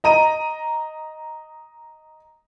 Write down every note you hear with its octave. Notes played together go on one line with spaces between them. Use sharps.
D#5 A#5 D#7